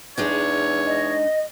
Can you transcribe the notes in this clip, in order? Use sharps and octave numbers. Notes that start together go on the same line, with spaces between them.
E2 G#3 D4 D#4 C#5
D#5